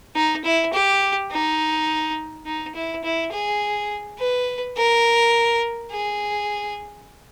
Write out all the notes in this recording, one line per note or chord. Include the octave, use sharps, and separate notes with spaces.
D#4
E4
G4
D#4
D#4
E4
E4
G#4
B4
A#4
G#4